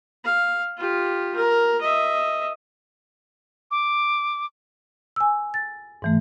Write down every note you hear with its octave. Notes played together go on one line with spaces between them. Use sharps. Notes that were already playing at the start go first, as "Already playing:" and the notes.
F5
F4 G4
A#4
D#5 E5
D6
G#5 E6
A6
G#2 E3 A3